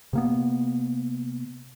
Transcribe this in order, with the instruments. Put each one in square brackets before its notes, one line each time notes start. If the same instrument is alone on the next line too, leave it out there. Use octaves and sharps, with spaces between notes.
[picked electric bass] C3 A#3 B3